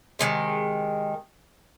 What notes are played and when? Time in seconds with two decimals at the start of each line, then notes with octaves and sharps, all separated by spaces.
0.19 C3 D#3 G#3